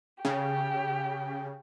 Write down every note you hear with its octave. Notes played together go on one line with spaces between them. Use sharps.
C#3 G4